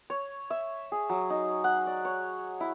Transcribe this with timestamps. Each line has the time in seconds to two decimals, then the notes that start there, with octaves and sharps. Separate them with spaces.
0.10 C#5
0.50 E5
0.92 G#4
1.09 F#3
1.30 D#4
1.64 F#5
1.87 D5
2.05 C#5
2.60 E4